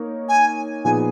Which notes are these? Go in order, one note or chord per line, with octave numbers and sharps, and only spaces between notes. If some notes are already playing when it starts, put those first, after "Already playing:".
Already playing: A#3 D#4 A#4 C#5
G#5
A#2 F3 B3 D#4 G#4 G#5